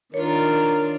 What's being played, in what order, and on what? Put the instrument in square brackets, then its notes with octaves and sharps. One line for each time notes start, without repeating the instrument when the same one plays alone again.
[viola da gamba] D#3 D4 F4 [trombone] A#4 [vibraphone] C#5